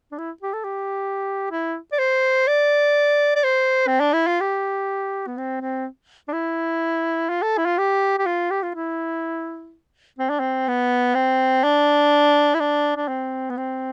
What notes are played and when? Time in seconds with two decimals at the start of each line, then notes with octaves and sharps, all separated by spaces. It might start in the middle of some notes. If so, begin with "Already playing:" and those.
0.12 D4
0.18 E4
0.43 G4
0.54 A4
0.64 G4
1.51 E4
1.92 D5
1.99 C5
2.48 D5
3.36 D5
3.44 C5
3.87 C4
4.01 D4
4.13 E4
4.27 F4
4.41 G4
5.27 B3
5.37 C4
5.61 C4
6.28 D4
6.33 E4
7.30 F4
7.42 A4
7.58 E4
7.66 F4
7.78 G4
8.18 G4
8.26 F4
8.51 G4
8.63 F4
8.75 E4
10.19 C4
10.30 D4
10.40 C4
10.68 B3
11.15 C4
11.64 D4
12.54 E4
12.60 D4
12.97 D4
13.08 C4
13.50 B3
13.57 C4